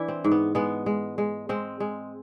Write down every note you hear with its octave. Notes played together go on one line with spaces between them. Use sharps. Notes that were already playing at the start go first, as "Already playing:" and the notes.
Already playing: E3 D4 E4
C4
G#2
B3
G#3 B3
G#3
G#3
G#3 C4
G#3